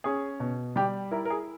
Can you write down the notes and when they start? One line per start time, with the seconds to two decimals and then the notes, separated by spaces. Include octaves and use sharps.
0.04 C#4 G#4
0.40 B2
0.76 G3 G4
1.11 E4 A#4
1.25 A#4
1.30 G#4